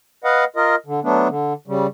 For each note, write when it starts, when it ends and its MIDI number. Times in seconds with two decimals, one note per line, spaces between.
0.24 0.44 71
0.24 0.44 75
0.24 0.44 77
0.24 0.44 78
0.56 0.75 65
0.56 0.75 70
0.56 0.75 75
0.86 1.00 50
1.04 1.28 54
1.04 1.28 57
1.04 1.28 59
1.04 1.28 62
1.28 1.53 50
1.67 1.87 49
1.67 1.87 55